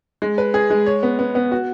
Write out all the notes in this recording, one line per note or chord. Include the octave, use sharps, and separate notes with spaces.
G#3
B4
G#4
G#3
C#5
B3
B3
B3
F#4